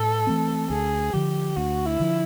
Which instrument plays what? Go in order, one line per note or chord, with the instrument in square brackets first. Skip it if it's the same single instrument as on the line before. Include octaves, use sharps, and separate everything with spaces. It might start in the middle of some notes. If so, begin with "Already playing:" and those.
Already playing: [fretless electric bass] A2 [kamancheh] A4
[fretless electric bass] E3 A3 C4
[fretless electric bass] D2 [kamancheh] G#4
[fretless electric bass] D3 F3 [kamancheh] G4
[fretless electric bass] D2 [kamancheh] F#4
[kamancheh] E4
[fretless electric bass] D3 F3